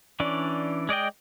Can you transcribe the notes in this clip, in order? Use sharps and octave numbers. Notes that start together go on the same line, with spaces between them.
E3 C#4 D4 D5
G#3 D5 D#5 G5